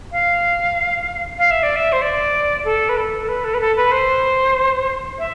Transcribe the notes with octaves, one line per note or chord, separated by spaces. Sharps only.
F5
F5
E5
D5
E5
C5
D5
A4
B4
A4
B4
A4
B4
A4
B4
C5
E5